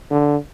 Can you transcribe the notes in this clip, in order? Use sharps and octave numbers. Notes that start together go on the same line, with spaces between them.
D3